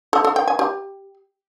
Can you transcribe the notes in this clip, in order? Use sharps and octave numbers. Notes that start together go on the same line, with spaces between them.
A4
A4
G5
G#5
G4